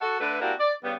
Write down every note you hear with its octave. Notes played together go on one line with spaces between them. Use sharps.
F#4 A4
D3 A3 B4
A#3 C4 D4 E4 F#4 G4
D5
G2 C#3 G3 B3